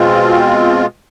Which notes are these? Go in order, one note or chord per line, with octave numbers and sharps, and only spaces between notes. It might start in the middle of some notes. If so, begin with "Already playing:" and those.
Already playing: B2 G#3 C4 F4